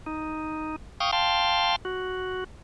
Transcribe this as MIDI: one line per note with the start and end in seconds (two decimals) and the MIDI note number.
0.06 0.76 63
1.00 1.11 77
1.00 1.11 79
1.00 1.11 85
1.00 1.11 87
1.12 1.76 77
1.12 1.76 79
1.12 1.76 81
1.12 1.76 84
1.85 2.44 66